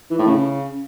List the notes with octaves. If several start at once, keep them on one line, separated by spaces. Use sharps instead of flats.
E3
A2
C#3